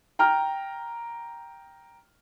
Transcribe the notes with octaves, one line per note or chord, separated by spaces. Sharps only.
G5 A#5 F6